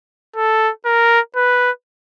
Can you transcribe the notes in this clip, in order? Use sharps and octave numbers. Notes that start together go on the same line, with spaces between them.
A4
A#4
B4